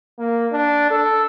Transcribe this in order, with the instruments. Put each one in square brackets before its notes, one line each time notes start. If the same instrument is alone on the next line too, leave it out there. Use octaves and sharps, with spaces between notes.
[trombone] A#3
D4
A4